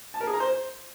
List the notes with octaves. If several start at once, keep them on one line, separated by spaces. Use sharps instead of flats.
A5
A#4
G#4
A#5
C5